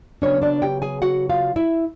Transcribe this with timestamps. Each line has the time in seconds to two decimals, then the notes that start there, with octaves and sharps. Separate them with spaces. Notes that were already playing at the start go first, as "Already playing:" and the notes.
0.22 C#3 F#3 B3 C#4 D4 C#5
0.42 D4 D5
0.62 G4 G5
0.82 G#4 G#5
1.02 F#4 F#5
1.29 F4 F5
1.56 E4 E5